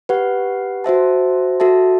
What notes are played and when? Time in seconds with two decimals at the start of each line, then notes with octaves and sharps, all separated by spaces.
0.09 G4 B4 F#5
0.84 F#4 C5 E5 A5
1.60 F#4 A4 E5 A5